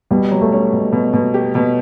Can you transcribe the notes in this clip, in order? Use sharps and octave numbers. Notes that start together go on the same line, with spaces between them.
B2 G3
F#3
A3
C#4
B2
B2
B2
G4
B2